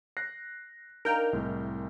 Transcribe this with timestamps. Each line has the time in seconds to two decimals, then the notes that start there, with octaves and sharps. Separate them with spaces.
0.17 F#6 A#6 C7
1.05 D4 D#4 A#4 F5 G5 F6
1.33 C2 A2 G#3